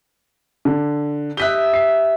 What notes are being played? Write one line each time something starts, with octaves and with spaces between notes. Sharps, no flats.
D3
G4 D#5 E5 F#6 B6 G7
C7